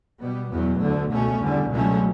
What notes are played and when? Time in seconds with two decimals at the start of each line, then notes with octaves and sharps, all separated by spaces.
0.21 B2 G3 B3
0.51 E2 B2 F#3 B3
0.81 D2 D3 A3
1.12 C#2 B2 A3 C#4
1.41 E2 D3 G3
1.71 C#2 B2 F#3 A3 C#4